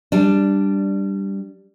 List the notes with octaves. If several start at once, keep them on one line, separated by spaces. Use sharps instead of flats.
G3 D4